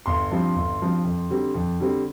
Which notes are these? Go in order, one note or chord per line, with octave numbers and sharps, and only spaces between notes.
G1 C6
G2 F3 C4
G1
G2 F3 C4
F2
D3 G3 C4
F2
D3 G3 C4